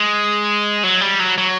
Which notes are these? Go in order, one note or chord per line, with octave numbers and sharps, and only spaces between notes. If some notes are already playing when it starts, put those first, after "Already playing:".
Already playing: G#3
F#3
G3
F#3
F#3